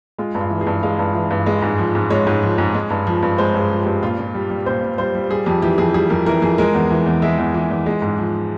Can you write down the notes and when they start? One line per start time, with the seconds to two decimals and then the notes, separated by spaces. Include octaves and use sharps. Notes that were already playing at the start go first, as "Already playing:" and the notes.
0.19 G#3 F4
0.35 G2
0.41 F4
0.50 E3
0.61 G#4
0.67 G2
0.83 G#3 F5
0.99 G2
1.15 E3
1.31 G2
1.46 G#3
1.62 G#2
1.78 F3
1.95 G#2
2.10 G#3 C#5
2.27 G#2
2.43 F3
2.58 G#2
2.74 G#3
2.90 G2
3.07 F3
3.23 G2
3.38 G#3 C5
3.54 G2
3.60 G#4
3.71 F3
3.81 G2 G4
4.03 A#2 F4
4.19 A#2
4.35 G3
4.50 G3
4.66 A#2 C5
4.82 A#2
4.98 G3 C5
5.15 G3
5.30 G3 G#4
5.46 F2 G4
5.62 E3 G4
5.78 F2 G#4
5.94 G3 G#4
6.10 F2 A#4
6.26 E3 A#4
6.42 F2 G#4
6.58 G#3 A#4
6.74 E2
6.91 E3
7.06 E2
7.22 G#3 E5
7.38 E2
7.54 E3
7.70 E2
7.86 G#3
8.02 G#2
8.18 F3